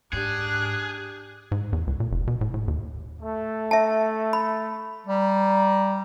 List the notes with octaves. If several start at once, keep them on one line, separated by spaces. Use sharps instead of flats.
G#2 D4 G4 G#4 F#6
G#2
E2
C#2
A#2
F1
B2
A2
A2
D#2
A3
E5 A5
B5
G3 A#5